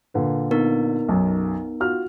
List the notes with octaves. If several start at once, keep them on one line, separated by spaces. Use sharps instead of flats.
A#2 D3 B4
B3 D#4 A#4
B1 F#2
F4 F#4 F6